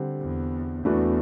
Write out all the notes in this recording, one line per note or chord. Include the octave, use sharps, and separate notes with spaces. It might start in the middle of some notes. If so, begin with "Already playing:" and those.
Already playing: D3 G3 C4
E2
E2 E3 A3 D4 F#4 B4